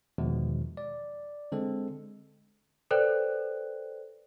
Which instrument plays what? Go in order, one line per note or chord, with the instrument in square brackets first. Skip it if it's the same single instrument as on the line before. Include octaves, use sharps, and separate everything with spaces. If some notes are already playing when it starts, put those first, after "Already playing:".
[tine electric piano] E2 B2 D#3 F3 G#3
D5
D3 G#3 C4 A4
[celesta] A4 B4 C5 D5 G5 F#6